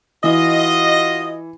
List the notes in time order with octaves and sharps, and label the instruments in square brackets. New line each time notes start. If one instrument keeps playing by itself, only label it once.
[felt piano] E3 [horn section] F4 F#4 D#5